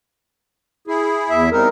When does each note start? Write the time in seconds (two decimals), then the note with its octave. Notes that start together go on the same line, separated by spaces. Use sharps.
0.87 E4 G#4
1.30 E2 E5
1.52 G3 C4 D#4 A#4